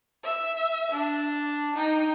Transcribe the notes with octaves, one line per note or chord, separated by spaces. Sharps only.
E5
D4
D#4 G5